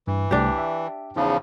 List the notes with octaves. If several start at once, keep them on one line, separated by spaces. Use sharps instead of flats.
G2 E3
C2 A3 D4 G4
E5
E2 C#3 F3 D#4